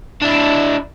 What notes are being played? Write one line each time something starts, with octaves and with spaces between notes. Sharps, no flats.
D4 E4